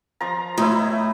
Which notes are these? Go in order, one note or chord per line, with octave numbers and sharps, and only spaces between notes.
F3 A#5
A2 D#4 E4